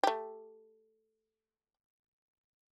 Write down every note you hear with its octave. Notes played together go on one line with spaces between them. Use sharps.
A3 G4